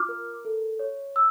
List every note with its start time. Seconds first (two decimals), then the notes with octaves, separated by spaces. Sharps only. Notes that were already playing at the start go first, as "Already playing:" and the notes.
Already playing: F4 D6 F6
0.09 A#4
0.45 A4
0.79 C#5
1.16 E6